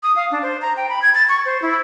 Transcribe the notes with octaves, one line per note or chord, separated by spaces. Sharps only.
D#6
F5
D4
C5
A#5
G5
B5
G#6
A6
C#6
C5
E4